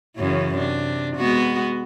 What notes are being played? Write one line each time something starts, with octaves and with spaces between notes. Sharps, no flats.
F#2 C#3 E3
C3 D4
G#3 B3 F#4